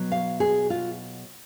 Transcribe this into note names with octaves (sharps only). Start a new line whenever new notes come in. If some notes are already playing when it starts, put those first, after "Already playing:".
Already playing: B2 F#3
F5
G#4
F4